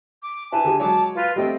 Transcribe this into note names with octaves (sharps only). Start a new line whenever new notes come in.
D6
E4 B4 C5 G#5 A5
D3 G4 G#4
F#3 G#3 C#5 A5 D6
F4 B4 F5
G3 A3 C4 D#5 G5